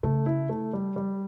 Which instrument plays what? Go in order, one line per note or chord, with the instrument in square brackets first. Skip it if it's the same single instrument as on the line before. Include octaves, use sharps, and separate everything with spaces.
[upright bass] C#3 [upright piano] A3
[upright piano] E4
A3
G3
G3